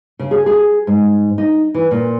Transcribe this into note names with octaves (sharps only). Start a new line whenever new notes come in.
C#3
G#4
G#4
G#2
D#4
E3
A#2